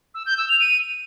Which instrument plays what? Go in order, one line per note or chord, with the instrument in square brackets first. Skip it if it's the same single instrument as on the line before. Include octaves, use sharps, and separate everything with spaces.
[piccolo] E6
G6
E6
F7
D#7